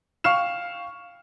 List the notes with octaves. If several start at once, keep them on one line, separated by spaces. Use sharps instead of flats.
F5 G5 C#6 F6 C7 E7